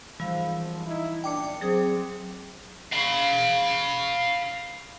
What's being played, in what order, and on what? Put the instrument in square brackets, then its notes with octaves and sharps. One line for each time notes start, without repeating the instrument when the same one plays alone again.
[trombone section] G#1 G#2 F3 [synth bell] E3 [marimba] G3 F5
[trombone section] D#4 E4
[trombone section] F#2 A#2 D4 [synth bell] G5 D6 C#7
[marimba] F#3 G#4 D#6 [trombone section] C4
[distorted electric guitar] F5 B5